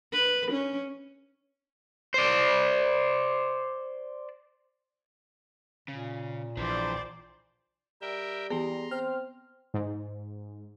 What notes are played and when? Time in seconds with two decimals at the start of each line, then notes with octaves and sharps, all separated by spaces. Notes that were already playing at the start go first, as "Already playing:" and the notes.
0.12 B4
0.51 C#4
2.14 C5 D5
5.88 A#2 C#3
6.57 A#1 E3 D4 C5 D5
8.02 G3 A#4 E5 G5
8.50 E3 B3 G4 G#4 A#5 C6
8.91 C4 F6
9.74 G#2